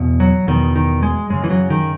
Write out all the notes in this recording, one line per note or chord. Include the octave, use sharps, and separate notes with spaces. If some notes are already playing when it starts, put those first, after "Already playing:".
Already playing: E2 B2
F#3
E2 B2 D#3
D#3
G#3
F#2 C#3 G#3
E3
F#3
D#3